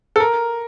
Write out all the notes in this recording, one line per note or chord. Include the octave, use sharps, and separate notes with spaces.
A4
A#4